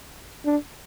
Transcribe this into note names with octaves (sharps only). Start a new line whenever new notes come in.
D4